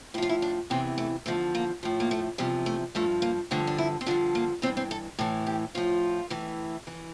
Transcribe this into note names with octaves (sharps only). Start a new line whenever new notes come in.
A2 F3 E4 F4
E4
D4
E2 C3 E3 C4
A3
E2 D3 F3 A3
A#3
A2 F3
A#3
A3
E2 C3 F3 G3
A3
G2 F3 A3
A#3
G2 D3 F3 A3
D4
E4
C4
G2 D3 F3 D4
A#3
G2 E3 C4
C4
A4
A2 E3 A4
G4
A2 F3 F4
A2 E3
E3